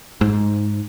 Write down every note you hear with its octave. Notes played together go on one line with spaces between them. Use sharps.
G#2